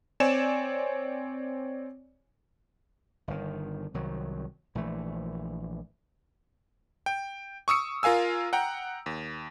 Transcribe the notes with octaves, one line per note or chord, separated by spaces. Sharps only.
C4 C#5 D5 G#5 E7
G1 D#3
C2 D#3 F#3
A#1 E3 A3
G5
C#6 D#6 E6 C#7
F4 A#4 F5 G#5 E6
F#5 G5 A#5
D#2